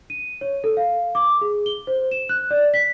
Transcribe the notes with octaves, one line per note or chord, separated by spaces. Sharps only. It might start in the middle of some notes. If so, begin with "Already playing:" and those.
D#7
C#5
A4
F5
D6
G#4
G7
C5
E7
F#6
D5
B6